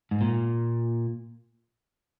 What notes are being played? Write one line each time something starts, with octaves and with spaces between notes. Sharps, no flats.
G#2
A#2